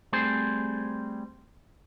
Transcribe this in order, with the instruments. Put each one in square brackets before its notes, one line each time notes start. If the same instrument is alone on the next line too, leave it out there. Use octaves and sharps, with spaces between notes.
[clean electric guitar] G3 A3 C4 G#4 C5